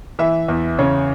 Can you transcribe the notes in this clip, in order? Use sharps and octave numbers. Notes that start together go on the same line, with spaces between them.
E3 E5
E2
C#3 C#5